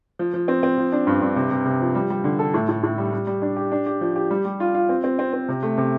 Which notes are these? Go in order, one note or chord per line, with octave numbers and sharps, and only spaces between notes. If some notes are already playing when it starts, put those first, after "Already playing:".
F3
F3
C4
C4
F3
D4
G2
G2
C3
C3
C3
F3
G3
G3
D3
A4
A2
A2
A2
G3
G3
G3
D4
G4
D4
G4
F3
G4
G3
G3
F4
F4
C4
C4
C4
C4
C3
A3
C3